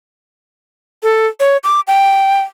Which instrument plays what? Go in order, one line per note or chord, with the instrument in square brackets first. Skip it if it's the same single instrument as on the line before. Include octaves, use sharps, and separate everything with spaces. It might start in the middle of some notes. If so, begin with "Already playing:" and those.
[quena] A4
C#5
D6
G5